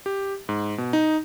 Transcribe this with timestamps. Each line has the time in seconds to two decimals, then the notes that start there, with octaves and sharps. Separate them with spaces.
0.06 G4
0.49 G#2
0.78 B2
0.93 D#4